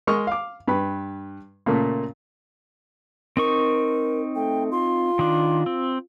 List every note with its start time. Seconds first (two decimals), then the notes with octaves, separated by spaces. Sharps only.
0.07 G#3 A#4 C#6 D#6 F6
0.27 F5 D6
0.68 G2 B4 B5
1.66 A#2 C#3 A3 A#3
3.37 C4 D#4 A#4 C#6
4.36 A3 G5
4.72 F4 C6
5.19 D#3 D4
5.66 C4